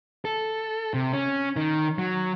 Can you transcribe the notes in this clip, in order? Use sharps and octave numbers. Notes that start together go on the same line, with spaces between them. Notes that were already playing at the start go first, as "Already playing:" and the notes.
A4
C3
C#4
D#3
F#3